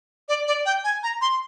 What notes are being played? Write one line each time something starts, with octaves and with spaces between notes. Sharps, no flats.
D5
D5
G5
G#5
A#5
C6